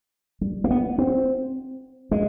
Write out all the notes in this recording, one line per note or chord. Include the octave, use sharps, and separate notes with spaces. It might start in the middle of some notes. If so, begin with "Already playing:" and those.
G3
A#3
B3
C4
G#3